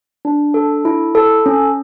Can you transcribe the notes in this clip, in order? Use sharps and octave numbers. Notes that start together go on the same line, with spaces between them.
D4
A4
E4
A4
C#4